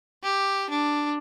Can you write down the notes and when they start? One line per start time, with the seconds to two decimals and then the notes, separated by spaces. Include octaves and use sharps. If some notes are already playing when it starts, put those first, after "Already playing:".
0.23 G4
0.70 D4